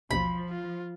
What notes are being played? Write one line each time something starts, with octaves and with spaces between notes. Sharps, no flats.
A1 D#2 B2 F3 B5
F4